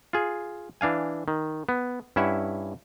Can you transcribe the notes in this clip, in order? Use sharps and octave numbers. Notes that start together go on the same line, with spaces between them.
F4 G#4
E3 D4 F5 G#5
D#3
B3
G2 C#4 E4 E5 F#5